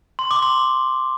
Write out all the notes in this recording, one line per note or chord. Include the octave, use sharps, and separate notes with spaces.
C6
D6
C6